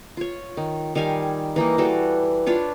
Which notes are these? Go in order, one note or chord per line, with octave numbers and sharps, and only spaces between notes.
F4 C#5
D#3
D#3 G3 F5 G#5
E3 A#3 D#4
E3 G3 F#4 A4
D4 F4 B4 C#5